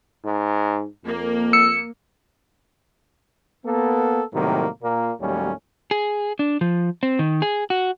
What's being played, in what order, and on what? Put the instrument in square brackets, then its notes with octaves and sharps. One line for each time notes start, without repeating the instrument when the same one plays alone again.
[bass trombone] G#2
[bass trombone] F2 [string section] A#3
[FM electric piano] E6 C#7
[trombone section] A#3 B3 A4
A2 C3 D#3 F#3 G3 A#3
A#2 A#3
D#2 A2 F#3 G3 A3 C#4
[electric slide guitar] G#4
D4
F3
C4
D#3
G#4
F#4